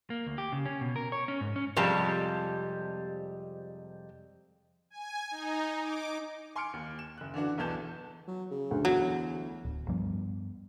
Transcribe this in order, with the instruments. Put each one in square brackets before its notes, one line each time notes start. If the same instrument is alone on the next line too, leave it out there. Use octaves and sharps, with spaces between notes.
[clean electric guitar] A#3
D2
G4
C#3
C#4
B2
A#4
C#5
C#4
G#2
C#4
[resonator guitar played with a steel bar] F2 C3 G3 G#3 A5
[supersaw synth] G#5
D#4
D6
[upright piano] G#5 C6 D6 F6 C#7 D7
D#2
E7
F#1 F#6
D3 E3 D4 F#4
B1 E2 E3 A5 G6 E7
[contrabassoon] F#3
C#3
[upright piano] D2
[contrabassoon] E2 [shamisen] F#3
[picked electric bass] D1
G2 F3 G3 B3